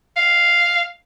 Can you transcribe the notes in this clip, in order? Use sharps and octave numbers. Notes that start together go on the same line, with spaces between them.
F5